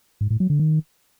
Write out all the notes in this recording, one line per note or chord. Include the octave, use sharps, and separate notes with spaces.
G#2
A2
F#3
D3
D#3